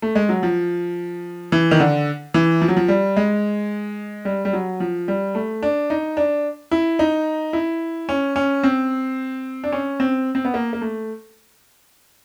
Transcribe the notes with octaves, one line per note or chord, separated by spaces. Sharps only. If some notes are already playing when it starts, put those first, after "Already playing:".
A3
G#3
F#3
F3
E3
D#3
D3
E3
F3
F#3
F3
G3
G#3
G3
G3
F#3
F3
G3
A3
D4
D#4
D4
E4
D#4
E4
C#4
C#4
C4
D4
C#4
C4
C4
B3
A#3
A#3
A3